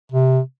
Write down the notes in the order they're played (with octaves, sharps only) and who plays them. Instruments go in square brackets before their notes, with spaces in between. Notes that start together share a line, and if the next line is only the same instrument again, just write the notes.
[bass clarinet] C3